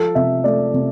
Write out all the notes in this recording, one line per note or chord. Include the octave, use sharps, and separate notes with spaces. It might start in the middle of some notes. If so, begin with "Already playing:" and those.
Already playing: F3 A4
C3 E5
A3 D5
C3